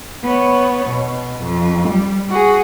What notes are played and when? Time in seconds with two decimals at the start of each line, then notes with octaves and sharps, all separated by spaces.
0.24 B3 C#5
0.90 B2
1.44 F2
1.89 G3
2.30 F#4 G#4